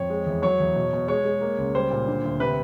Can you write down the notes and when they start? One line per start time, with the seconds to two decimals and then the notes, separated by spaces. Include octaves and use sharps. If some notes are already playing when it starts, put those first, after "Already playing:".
Already playing: F2 C#5
0.10 G#3
0.26 E2
0.42 F#3 C#5
0.60 E2
0.75 B2
0.93 B2
1.08 G#3 C#5
1.25 G#3
1.41 A#3
1.58 C#2
1.75 G3 C5
1.91 A#2
2.08 D3
2.24 D2
2.40 C3 B4